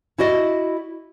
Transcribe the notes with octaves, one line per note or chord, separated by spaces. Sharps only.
E4 F#4 D5 D#5